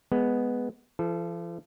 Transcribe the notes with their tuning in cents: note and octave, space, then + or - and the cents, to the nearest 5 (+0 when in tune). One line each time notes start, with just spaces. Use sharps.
G#3 +0 B3 +0
F3 -45 A4 -20